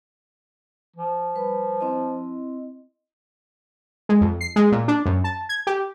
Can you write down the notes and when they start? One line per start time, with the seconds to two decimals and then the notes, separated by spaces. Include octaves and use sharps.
0.97 F3
1.34 G3 B4 B5
1.81 C4 E4 D#5
4.09 G#3
4.21 F2
4.41 C7
4.56 G#3
4.72 A#2
4.88 D4
5.06 F#2
5.24 A5
5.49 G#6
5.67 G4